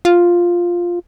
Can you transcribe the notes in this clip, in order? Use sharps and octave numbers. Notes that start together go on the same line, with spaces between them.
F4